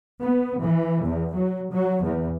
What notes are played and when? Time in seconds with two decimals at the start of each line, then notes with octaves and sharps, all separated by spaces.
0.22 B3
0.63 E3
1.05 E2
1.37 F#3
1.72 F#3
2.04 E2